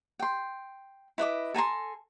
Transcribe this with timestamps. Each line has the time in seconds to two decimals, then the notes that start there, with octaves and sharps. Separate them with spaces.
0.19 G5 C6
1.18 E4 B4 D#5 D6
1.54 A4 G#5 A#5 C6